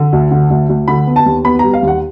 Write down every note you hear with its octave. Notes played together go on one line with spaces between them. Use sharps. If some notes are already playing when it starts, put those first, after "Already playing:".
Already playing: D3
D2
D3
D2
D2
D3 B5
B3
A5
D#2
B3 B5
G3 A#5
F5
D#2
F#5